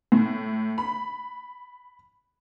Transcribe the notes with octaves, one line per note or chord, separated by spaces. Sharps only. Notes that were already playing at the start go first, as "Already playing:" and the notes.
A2
B5